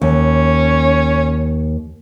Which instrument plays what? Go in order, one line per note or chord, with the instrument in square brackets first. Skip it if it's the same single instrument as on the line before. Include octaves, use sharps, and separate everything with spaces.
[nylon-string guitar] D#2 [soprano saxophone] C#4